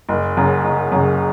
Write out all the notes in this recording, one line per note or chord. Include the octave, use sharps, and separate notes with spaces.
F#1
F#2 C#3
F#1
F#2 C#3